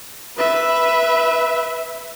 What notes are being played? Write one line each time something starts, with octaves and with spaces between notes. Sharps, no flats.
B4 E5